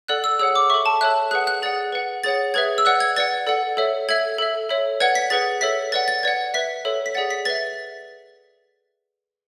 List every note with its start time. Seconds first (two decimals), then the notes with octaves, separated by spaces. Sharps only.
0.08 A4 D5 F#5 F#6
0.24 E6
0.39 G#4 C#5 F#5 E6
0.55 D6
0.70 A4 E5 C#6
0.86 A5
1.01 A4 C#5 E5 F#6
1.31 G#4 B4 F#5 F#6
1.47 F#6
1.62 G#4 D5 F#5 A6
1.92 B4 F#5
2.24 G#4 C#5 F#5 A6
2.54 G#4 B4 E5 G#6
2.78 E6
2.85 B4 D5 F#5 F#6
3.00 G#6
3.16 B4 D5 F#5 A6
3.47 A4 D5 F#5
3.77 A4 C#5 E5
4.09 A4 E5 G#6
4.38 A4 E5
4.69 A4 C#5 E5
5.00 B4 D5 F#5 G#6
5.15 B6
5.30 G#4 B4 F#5 A6
5.61 A4 C#5 E5 B6
5.92 B4 D5 F#5 A6
6.08 A6
6.23 B4 D5 F#5 G#6
6.54 B4 E5 B6
6.85 A4 C#5 E5
7.06 B6
7.15 G#4 D5 F#5 A6
7.30 B6
7.45 B4 E5 A6